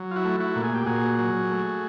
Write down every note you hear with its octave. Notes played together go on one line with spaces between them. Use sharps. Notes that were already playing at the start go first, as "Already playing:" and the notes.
Already playing: F#3
F4
E4 F#4
A3
E4 F#4
A#2
G#4
G4
A#2 F#4 G#4
F#3
A3